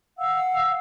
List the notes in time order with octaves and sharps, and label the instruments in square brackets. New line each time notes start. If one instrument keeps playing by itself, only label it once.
[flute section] F5 F#5 E6